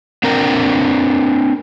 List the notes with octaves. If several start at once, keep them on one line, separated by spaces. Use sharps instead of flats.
C4 D4 A#4